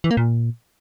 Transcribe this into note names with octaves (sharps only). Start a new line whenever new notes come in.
E3
A#3
A#2